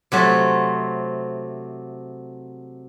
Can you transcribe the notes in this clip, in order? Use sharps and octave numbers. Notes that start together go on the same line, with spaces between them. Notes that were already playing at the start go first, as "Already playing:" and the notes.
C3 F#3 A3